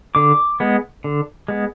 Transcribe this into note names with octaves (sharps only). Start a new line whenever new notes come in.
D3 D6
G#3 B3
D3
G#3 B3